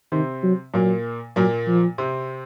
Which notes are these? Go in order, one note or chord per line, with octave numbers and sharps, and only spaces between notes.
C3 D#3 C4
F#3
A#2 F#3 A#3
A#2 F#3 A#3
F3
C3 C4